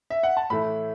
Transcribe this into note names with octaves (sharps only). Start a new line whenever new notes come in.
E5
F#5
A5
A2 E3 A3 E4 B5